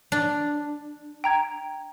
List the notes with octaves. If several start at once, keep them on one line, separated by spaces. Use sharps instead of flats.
D4
G5 A#5 G#6